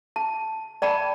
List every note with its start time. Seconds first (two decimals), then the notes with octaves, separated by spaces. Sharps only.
0.16 A5
0.82 D5 G5 A5 B5